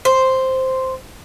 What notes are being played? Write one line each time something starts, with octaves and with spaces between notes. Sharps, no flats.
C5